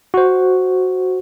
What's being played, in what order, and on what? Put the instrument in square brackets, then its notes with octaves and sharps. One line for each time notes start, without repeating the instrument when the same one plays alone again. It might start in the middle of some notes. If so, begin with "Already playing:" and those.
[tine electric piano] F#4 C5